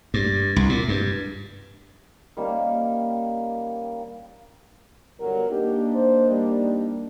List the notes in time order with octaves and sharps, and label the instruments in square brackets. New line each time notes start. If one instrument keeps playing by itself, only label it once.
[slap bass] G2
C2
A#2
G2
[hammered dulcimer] D#3 G3 A#3 C#4
[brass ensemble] G1 F#3 [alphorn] A#4
[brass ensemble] A#3 D4 D#4 [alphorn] G4
[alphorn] C5
G3